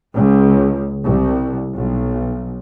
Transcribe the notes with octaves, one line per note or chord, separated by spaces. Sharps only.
C#2
C2
B1